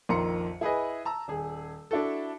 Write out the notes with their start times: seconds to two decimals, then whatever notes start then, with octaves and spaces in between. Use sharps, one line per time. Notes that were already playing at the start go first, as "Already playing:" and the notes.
0.09 A#1 F2 D#3 A#5 C6 C#7
0.61 E4 G#4 B4 D#5
1.05 A5 A#5 E6
1.28 D#1 G#4
1.91 D4 E4 F#4 A4